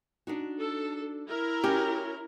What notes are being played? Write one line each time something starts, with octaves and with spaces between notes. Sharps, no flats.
D4 D#4 F#4
A4
E4 A#4
C#4 F#4 G4